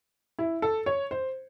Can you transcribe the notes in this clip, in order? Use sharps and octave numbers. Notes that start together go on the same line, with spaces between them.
E4
A4
C#5
C5